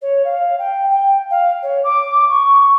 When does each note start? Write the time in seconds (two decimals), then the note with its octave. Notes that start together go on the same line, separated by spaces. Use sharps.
0.01 C#5
0.24 F5
0.58 G5
0.90 G5
1.30 F5
1.62 C#5
1.83 D6
2.29 C#6